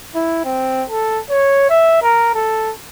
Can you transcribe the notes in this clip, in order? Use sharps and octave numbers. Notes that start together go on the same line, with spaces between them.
E4
C4
A4
C#5
E5
A#4
A4